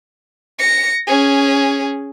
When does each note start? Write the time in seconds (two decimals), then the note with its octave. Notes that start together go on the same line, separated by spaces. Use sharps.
0.59 A#6 C#7
1.07 C#4 G#4